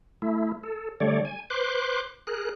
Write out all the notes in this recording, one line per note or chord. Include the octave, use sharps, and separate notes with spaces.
A3 E4
A4
D3 G3 A3 C#5 D5
G#5
B4 C5 C6 D6 F#6
G#4 A#4 F#6